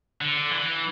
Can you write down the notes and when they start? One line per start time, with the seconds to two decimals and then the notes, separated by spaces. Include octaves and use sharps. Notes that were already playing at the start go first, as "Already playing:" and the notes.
0.21 D3
0.52 E3